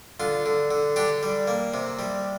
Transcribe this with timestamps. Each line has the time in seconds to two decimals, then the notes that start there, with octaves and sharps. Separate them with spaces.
0.20 D3 F4
0.46 D3
0.71 D3
0.96 D3 D4 G4
1.23 G3
1.48 A#3
1.74 C3
1.99 G3